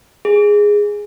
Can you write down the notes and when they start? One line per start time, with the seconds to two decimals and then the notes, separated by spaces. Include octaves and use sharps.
0.25 G#4